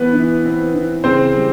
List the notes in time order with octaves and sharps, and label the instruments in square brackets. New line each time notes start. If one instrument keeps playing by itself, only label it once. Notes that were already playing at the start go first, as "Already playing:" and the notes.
Already playing: [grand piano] E3 [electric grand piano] B3 B4
[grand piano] E3
C4
E3
[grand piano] C#3 [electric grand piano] C4 C5
[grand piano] G3